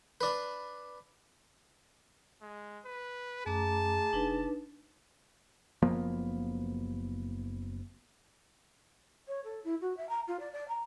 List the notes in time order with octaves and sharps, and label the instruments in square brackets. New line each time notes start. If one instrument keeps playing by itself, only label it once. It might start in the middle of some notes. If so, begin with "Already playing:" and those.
[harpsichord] D4 B4
[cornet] G#3
B4
[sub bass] F#2 [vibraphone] A3 A#5 D6 [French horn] G#4 [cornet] A5
[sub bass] F1 [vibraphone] D4 D#4 B4
[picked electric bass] F#1 F3 A#3 B3
[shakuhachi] C#5
A4
E4
F#4
E5
A#5
F4
D5
D5
A#5